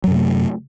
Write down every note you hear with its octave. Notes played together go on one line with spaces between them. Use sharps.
F#2 C3 F#3 A3